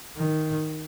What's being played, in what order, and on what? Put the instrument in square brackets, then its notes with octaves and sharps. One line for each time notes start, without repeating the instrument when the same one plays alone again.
[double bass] D#3